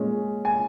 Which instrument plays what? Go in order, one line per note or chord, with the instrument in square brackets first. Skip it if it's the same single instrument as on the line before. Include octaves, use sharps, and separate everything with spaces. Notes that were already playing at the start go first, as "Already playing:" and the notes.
Already playing: [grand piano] A#2 G#3 C#4
G#5